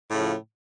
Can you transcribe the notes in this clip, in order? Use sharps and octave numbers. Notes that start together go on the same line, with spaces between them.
A2 C#3 F3